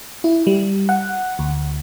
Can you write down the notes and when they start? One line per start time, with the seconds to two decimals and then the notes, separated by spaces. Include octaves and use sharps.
0.24 E4
0.47 G3
0.89 F#5
1.39 D2